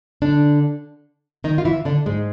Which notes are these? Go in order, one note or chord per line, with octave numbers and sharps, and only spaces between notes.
D3 D4
D#3 D#4
F4
E3 E4
D3 D4
G#2 G#3